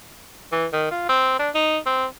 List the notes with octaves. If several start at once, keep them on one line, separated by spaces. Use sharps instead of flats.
E3
D#3
F4
C4
D4
D#4
C4